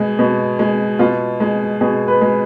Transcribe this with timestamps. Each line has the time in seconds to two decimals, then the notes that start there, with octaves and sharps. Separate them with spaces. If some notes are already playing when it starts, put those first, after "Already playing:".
Already playing: B2 G#3
0.19 B2
0.59 G#3
0.99 B2 F4
1.40 G#3
1.81 B2 G#4
2.08 B4
2.21 G#3